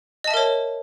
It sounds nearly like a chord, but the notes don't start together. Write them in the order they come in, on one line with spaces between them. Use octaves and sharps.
D#5 A5 E5 A#4 C#5